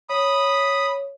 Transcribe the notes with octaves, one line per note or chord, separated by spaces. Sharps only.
C#5 B5 D#6